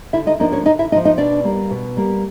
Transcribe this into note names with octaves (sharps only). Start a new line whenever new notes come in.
D3 E4 E5
D#4 D#5
F3 A#3 D4 D#4 D#5
C#4 C#5
D3 D#4 D#5
E4 E5
F3 A#3 D4 D#4 D#5
D#4 D#5
B2 D4 D5
G3 A#3
B2
G3 A#3